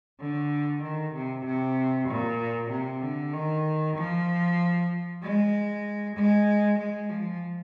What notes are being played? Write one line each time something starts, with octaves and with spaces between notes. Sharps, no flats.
D3
D#3
C3
C3
A#2
C3
D3
D#3
F3
G#3
G#3
G#3
F3